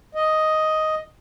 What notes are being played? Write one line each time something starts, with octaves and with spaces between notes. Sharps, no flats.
D#5